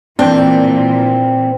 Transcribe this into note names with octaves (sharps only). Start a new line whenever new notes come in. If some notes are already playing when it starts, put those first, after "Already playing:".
A#2 E3 C4 D4 G5